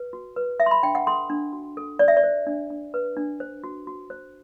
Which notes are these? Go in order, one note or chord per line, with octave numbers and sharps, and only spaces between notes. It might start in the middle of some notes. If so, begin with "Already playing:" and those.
Already playing: B4
F#4
B4
A4 E5
C6
B5
D4 G5
F#5
A4 C6
D4
F#4
A4
C5 D5
E5
D5
C5
D4
D4
B4
D4
C5
F#4
F#4
C5